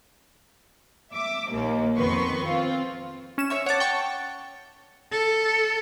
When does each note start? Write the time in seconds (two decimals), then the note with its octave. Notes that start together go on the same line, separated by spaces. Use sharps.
1.13 E5 D6
1.51 A#1 D#2 A#3
1.96 F2 D#3 B3 B4 C6 C#6
2.45 C4 F4
3.38 C#4 E7
3.50 C#5 E5 C#6
3.66 C#5 F#5 A5 D6
3.80 G5 C#6
5.12 A4